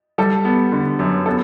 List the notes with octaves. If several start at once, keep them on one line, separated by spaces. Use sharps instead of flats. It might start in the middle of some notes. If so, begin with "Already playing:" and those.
G3 A4
B3
D3
F#2
B3 A4